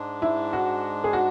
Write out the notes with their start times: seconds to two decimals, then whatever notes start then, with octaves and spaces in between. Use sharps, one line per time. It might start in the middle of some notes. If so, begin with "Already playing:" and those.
Already playing: G#2 G#3 D4
0.22 E4
0.53 F#4
1.04 G#4
1.13 F#4